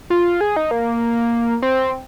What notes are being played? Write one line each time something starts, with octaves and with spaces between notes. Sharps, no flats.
F4
G#4
D#4
A#3
C4